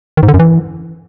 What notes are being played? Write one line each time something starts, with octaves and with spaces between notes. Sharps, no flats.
D#3
G#2
D3
F#2
E3